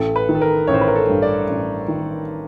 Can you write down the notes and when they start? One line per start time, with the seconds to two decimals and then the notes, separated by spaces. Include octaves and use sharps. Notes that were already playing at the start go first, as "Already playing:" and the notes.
Already playing: A1 A4
0.16 B4
0.29 D#3
0.35 A4
0.41 A#4
0.67 A1 C#5
0.74 C5
0.81 B4
0.88 A#4
0.96 A4
1.09 G2
1.22 D5
1.48 A1
1.88 D#3